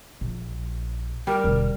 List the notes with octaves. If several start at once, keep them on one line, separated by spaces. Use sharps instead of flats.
A#1
G3 A#4
E1 D3